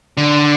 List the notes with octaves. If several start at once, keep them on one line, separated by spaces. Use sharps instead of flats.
D3